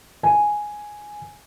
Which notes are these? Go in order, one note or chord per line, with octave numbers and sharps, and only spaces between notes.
G#5